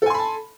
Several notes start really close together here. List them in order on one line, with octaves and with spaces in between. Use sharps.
A4 G#5 C6 B5 A5